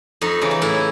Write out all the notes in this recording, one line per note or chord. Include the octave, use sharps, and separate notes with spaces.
F2 D#4
C#3 E3
D#4
A2 E4